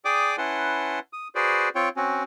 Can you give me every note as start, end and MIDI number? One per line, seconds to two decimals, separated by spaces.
0.05 0.36 68
0.05 0.36 74
0.05 0.36 79
0.05 0.36 86
0.05 0.36 87
0.38 0.99 61
0.38 0.99 64
0.38 0.99 71
0.38 0.99 78
0.38 0.99 81
0.38 0.99 84
1.13 1.28 87
1.35 1.69 66
1.35 1.69 68
1.35 1.69 71
1.35 1.69 72
1.35 1.69 74
1.75 1.89 60
1.75 1.89 65
1.75 1.89 73
1.75 1.89 79
1.97 2.23 60
1.97 2.23 61
1.97 2.23 66